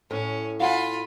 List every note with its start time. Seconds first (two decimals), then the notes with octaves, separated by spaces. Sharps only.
0.11 A2 C#4
0.60 F4 F5 F#5 G#5 B5